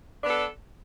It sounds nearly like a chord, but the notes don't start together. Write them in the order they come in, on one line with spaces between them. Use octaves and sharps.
D4 B3 A4